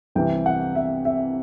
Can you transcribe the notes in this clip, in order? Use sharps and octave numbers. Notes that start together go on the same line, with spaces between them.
C2 C3 E3 G5
F#5
E5
E5